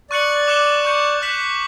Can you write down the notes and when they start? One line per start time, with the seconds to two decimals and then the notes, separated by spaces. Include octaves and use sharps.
0.10 D5 C#6 F#6 C#7 F#7
0.48 D6 F#6 C#7 E7 G7
0.85 C#6 G6 C#7 F#7
1.22 F#6 B6 F#7